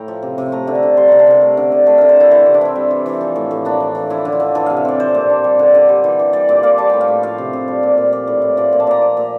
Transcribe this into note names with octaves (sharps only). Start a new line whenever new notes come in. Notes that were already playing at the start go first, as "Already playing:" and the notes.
Already playing: A2 G5 A#5
F3
C3
C3
A3 A#5
D3
A#5
D3
G3 C6
C3 A#5
A5
C3 A#4
A3
D3
D3
A3 A4
D3 A#4
C5
D3 E4
E3 E4
C3
D4
C4 E4
G3
E3
E3
F3
A2
A2
A#3 D4
E3
E3
F3 E4
D3
F4
D3
E3 A4
C3 F5
E5
C4 D5
F3 C5
A#2
D4
G3
D3
D3
G3
E3
E3
G3 D5
A#2
A#2 F5
G3 A5
A2 G5
F5
A2
F3 F5
C3
C3
G3
A#2
A#2
F3 D5
A2
A2
F3 D5
A#2
A5
A#2 A#5
F3
A#2